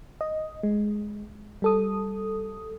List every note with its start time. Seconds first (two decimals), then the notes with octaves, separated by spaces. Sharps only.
0.21 D#5
0.63 G#3
1.62 G3 A4 D#6